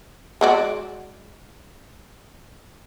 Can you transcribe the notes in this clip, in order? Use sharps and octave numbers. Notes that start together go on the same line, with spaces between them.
G#3 F#4 D5